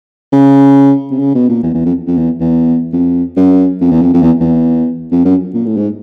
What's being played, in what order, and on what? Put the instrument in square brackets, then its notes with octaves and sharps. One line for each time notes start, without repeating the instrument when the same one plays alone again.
[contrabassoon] C#3
C3
C#3
B2
A#2
E2
E2
F2
F2
E2
E2
F2
F#2
F2
E2
F2
F2
E2
E2
F2
F#2
A#2
A2
G#2